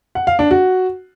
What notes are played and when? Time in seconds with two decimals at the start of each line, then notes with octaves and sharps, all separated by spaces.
0.15 F#5
0.27 F5
0.39 D4
0.51 F#4